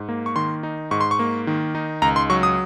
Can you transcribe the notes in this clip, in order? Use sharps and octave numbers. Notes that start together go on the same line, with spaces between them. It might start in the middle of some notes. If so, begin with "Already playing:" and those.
Already playing: G#2
A#3
C#6
D#3 C6
D#4
G#2 C#6
C6
C#6
A#3
D#3
D#4
C#2 A#5
C6
F#3 C#6
D#6